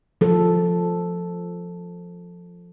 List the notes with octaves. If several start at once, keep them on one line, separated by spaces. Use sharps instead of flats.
F3 A4